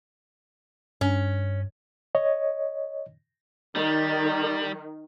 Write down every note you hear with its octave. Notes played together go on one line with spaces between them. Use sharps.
G2 C#4
C#5 D#5
D#3 G3